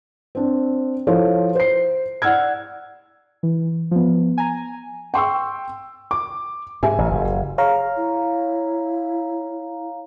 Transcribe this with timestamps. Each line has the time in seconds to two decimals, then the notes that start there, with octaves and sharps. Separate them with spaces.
0.35 C4 D4
1.07 F3 E4 A4 C5 C#5
1.55 C5 C7
2.22 D5 F#5 E6 F6 G#6
3.43 E3
3.91 F3 B3
4.38 G#5 A#5
5.14 G5 C6 C#6 E6
6.11 D6
6.83 G#2 G4 E5 G#5
6.98 A1
7.11 F#1
7.58 G#4 C#5 F5 A#5
7.96 E4